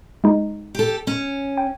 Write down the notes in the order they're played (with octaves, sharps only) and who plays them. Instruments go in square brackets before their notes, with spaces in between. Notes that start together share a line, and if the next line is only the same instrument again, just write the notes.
[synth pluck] G#3 D#4
[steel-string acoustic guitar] G4 A4
C#4
[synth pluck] G5